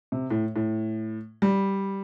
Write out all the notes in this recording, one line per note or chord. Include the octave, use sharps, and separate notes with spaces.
C3
A2
A2
G3